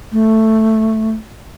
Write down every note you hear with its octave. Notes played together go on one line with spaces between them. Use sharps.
A3